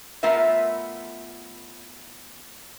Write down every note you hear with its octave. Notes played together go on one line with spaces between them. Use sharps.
A3 B3 F4 A#4 E5